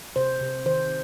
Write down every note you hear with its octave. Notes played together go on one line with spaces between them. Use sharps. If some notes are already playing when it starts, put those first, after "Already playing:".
C3 C5
C3
D#3 C5